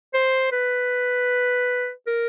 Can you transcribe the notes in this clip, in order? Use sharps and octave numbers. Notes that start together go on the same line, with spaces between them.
C5
B4
A#4